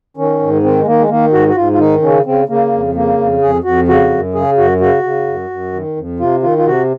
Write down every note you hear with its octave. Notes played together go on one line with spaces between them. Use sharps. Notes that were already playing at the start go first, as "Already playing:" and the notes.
D#3 C#4
G#2
D#3 C4
G#3
D#3 A#3
G#3
D#3 A#3
G#2 F#4
F#4
G#2 F4
F4
D#3 D#4
C#3 C#4
C#3 C4
C#3 A#3
F2
C#3 A#3
F2
F2 G#4
F2 F#4
C#3 F#4
F#2
C#3 G#4
F#2 F#4
C#3 F#4
C#3
F#2
F#2
D#3
F2
C3 F4
D#3 F4
F4
C3 F#4